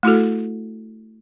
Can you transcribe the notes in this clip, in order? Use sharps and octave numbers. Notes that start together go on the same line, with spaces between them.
A3 E4 F#4 A4